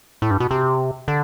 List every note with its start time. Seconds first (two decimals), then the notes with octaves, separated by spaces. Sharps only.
0.22 A2
0.31 G2
0.40 B2
0.51 C3
1.08 D3